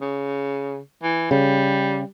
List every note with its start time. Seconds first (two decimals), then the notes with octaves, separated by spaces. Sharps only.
0.01 C#3
1.02 E3
1.31 C#3 G3